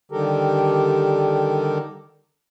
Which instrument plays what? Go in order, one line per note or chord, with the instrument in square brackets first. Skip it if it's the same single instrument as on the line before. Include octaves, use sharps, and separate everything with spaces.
[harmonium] D3 D#3 G3 G4 A4 A#4